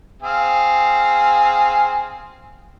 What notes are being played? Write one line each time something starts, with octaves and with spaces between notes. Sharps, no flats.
C4 G#4 F5